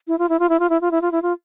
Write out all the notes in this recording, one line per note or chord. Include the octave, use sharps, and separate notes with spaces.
E4
F4
E4
F4
E4
F4
E4
F4
E4
F4
E4
F4